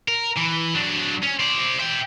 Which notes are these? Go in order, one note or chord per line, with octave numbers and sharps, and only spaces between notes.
A#4
E3
F#3 D4
C#4
C5 D5
E5 G5